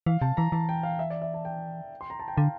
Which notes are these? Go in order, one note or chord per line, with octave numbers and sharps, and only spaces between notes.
E3 F5
C3 A5
E3 A#5
E3 A5
G5
F5
E5
D5
E5
A5
G5
C6
A#5
A5
G5
D3 F5